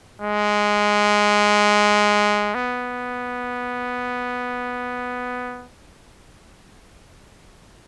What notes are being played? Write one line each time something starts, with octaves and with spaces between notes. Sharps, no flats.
G#3
B3